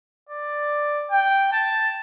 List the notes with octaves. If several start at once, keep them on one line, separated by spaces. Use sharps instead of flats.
D5
G5
A5